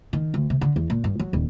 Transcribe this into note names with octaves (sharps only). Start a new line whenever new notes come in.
D#3
D2
C3
D3
E2
A#2
G2
F#3
D#1